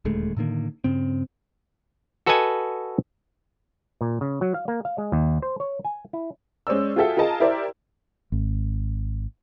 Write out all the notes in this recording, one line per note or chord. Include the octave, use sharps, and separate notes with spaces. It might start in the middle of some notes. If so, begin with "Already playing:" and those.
D#1 D2 G#3 A3
A2 D3 D#3 A#3
G2 C#3 C4
F#4 A4 B4 D#5 F#5 G#5
A#2
C#3
F#3
F5
A#3
F5
G#3
D#2
C5
C#5
G#5
E4
G#3 C#4 C5 D5 E6
F4 F#4 G#4 A4 E5 G5
F4 G#4 A#4 D#5 A5
E4 G4 A#4 C5 D5 E5
G#1